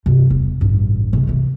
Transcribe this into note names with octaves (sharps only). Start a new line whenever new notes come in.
G2 C3
E1
A1 G2
G#2 C3
C3 E3